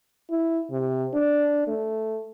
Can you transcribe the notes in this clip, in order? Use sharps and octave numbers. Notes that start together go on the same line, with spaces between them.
E4
C3
D4
A3